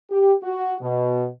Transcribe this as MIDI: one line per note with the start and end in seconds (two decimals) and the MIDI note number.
0.10 0.33 67
0.42 0.75 66
0.81 1.26 47